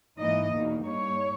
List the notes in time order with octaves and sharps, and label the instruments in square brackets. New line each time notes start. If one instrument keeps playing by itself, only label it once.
[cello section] G#2 E3 A#3 D#4 D#5
E2 B2 A#3 D#4
G2 G3 A#3 D#4 C#5